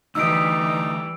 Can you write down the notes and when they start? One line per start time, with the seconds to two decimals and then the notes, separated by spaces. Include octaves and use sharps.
0.15 D2 E3 G3 D#4 E6 D7